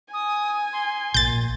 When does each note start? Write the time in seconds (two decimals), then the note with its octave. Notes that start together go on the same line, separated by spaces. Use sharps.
0.14 G#5 D#6
0.73 C6
1.14 A#1 A#2 G6 A6